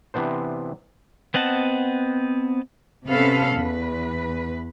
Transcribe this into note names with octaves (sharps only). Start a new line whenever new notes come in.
C3 E3 B3 D4 C5
B3 C4 D#5 F#5 A5
C3 B3 C#4 A4 B4 F5
E2 B4